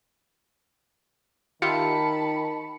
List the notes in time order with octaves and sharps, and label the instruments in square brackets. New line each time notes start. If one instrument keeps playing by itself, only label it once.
[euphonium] D#3 [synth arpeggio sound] F4 G4 E5 [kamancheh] A5 B5 [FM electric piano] C#7